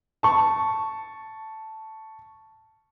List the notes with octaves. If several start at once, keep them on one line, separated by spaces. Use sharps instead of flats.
A5 C#6